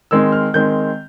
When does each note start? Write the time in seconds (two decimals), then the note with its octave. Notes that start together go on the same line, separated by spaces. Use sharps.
0.11 D#3 G#3 C4 E6
0.32 F6
0.54 D#3 G#3 C4 G6